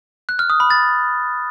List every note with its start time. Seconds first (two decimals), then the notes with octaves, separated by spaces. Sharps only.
0.29 F#6
0.39 F6
0.50 D#6
0.60 B5
0.70 A6